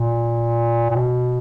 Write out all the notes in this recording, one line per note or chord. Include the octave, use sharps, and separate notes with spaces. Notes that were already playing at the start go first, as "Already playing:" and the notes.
Already playing: A#2
A#2
B2